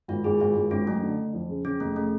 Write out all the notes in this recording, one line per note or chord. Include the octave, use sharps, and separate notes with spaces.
G#1 F4
G#1 G#4
G#1 F4
G#1
G#1 C#4
F#2 A3
D3
D3
F2
C#3
C#3 C#4
F1 A3
C#3 A3